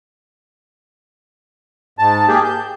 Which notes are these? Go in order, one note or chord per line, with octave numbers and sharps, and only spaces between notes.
G#2 A5
A#3 G4 G#4
G6